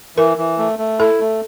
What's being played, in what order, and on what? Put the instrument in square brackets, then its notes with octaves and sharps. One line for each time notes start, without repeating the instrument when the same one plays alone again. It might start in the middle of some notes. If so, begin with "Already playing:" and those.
[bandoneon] E3 [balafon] A#4
[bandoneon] E3
A3
A3
[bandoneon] E4 [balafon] A4
[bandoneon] A3